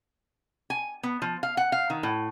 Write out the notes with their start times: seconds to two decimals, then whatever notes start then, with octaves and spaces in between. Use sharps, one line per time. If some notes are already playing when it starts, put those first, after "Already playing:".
0.70 G#5
1.03 B3
1.22 F3
1.43 F5
1.57 F#5
1.72 F5
1.90 D#3
2.03 A2